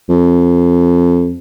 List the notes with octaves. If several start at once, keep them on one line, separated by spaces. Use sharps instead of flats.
F2